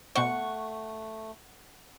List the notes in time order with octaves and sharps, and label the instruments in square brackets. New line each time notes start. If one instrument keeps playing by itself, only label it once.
[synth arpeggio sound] B2 C5 [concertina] A3 [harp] F#5 [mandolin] C#6